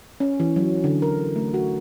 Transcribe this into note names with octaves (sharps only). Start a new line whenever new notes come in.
C#4
E3
F#3
D3
A#4
A3
F#4